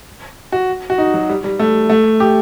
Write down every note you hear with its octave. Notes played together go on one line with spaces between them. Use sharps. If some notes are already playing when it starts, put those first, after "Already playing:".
F#4
F#4
D#4
F#3
G3
G3
A3
A3
G4